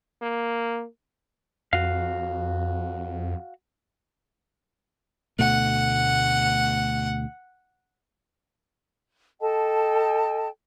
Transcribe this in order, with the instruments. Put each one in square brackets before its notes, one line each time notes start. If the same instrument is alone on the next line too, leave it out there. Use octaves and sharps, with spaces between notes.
[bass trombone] A#3
[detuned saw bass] F2 [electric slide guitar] F#4 F5
[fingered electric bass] D2 B2 A3 [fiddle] F#5
[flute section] A4 D#5 G5 A5